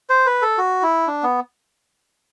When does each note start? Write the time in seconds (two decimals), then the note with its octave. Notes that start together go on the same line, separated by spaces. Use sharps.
0.10 C5
0.26 B4
0.42 A4
0.58 F#4
0.83 E4
1.08 D4
1.23 B3